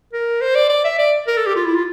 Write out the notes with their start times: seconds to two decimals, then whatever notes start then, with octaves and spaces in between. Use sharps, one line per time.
0.13 A#4
0.41 C5
0.56 D5
0.70 D5
0.84 E5
0.99 D5
1.27 A#4
1.37 A4
1.47 G4
1.56 F4
1.66 E4
1.75 F4